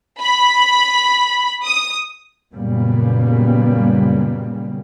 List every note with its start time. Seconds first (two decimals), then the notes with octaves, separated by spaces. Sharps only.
0.20 B5
1.65 D#6
2.54 F#2 A#2 C#3 G3 A#3 B3